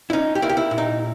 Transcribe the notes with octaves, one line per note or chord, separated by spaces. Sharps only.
E4
C#4 D#4
G4
A#3 E4
G4
E4
A#2
D#4